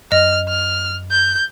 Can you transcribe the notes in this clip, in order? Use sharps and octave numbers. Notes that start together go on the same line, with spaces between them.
F#2 D#5 F6
F6
G6